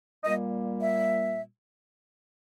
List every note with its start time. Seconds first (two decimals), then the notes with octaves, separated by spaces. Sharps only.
0.24 A#2 G3 A#3 D#5
0.81 E5